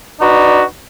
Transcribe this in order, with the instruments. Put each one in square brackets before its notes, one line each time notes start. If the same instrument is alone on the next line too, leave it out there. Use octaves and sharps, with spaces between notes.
[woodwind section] D4 D#4 F#4 B4 D5